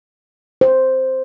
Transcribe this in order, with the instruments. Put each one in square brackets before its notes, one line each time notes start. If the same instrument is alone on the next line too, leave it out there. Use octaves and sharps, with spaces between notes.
[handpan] C5